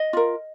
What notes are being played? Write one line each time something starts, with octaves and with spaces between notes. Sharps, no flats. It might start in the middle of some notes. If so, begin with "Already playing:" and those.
Already playing: D#5
F4 A#4